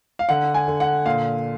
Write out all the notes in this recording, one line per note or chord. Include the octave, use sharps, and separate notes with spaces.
F5
D3 F#5
G#5
D3
F#5
A#2 F5